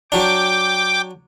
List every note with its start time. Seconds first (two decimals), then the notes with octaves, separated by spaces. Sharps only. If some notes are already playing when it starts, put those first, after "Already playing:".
0.12 F#3 D4 G5 D6